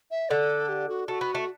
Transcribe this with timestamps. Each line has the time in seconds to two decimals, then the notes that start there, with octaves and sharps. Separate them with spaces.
0.11 E5
0.30 D3 A4
0.69 G4
0.89 F#4
1.08 A3 F#4
1.21 B3
1.35 A3